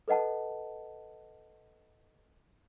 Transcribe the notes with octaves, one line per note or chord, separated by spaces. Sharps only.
A4 B4 D#5 F#5 A5